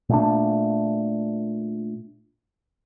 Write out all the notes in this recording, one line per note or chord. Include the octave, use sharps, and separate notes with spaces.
A#2 A3 D4